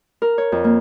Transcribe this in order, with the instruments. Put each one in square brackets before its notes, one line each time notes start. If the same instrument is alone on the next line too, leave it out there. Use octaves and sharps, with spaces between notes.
[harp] A#4
C#5
F2
A#3